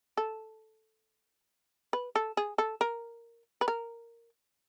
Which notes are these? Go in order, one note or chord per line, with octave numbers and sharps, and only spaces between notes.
A4
B4
A4
G#4
A4
A#4
B4
A#4